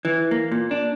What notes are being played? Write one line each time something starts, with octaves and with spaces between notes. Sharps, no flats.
E3
A#3
A#2
D4